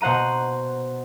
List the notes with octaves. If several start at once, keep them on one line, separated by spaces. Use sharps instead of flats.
B2 C5 F#5 A#5 D#7